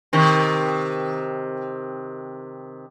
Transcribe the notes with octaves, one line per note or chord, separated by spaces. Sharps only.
C3 D#3